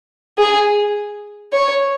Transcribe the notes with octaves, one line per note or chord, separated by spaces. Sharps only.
G#4
C#5